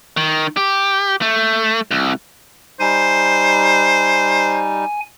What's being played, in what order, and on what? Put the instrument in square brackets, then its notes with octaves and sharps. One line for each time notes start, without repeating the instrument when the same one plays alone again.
[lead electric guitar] D#3
G4
A3
C2
[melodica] G3 D#4 [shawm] C5 [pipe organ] G#5